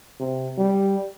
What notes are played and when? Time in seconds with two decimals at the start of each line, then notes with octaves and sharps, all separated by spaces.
0.20 C3
0.58 G3